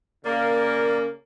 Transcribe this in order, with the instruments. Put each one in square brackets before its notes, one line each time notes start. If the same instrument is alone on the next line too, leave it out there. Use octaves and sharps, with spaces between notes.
[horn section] C#3 A#3 [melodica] A#4 D5